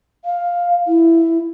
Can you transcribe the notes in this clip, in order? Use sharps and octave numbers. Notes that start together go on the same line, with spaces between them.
F5
E4